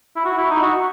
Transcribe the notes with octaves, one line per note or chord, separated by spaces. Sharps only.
E4
F#4
E4
D#4
F#4